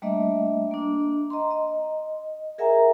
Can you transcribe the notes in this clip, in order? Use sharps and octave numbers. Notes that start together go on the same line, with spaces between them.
G3 A3 A#3 D4 D#5 E5
A#3 D4
D#5 A#5 C6
D#5
G#4 A#4 E5 F#5 G#5 A#5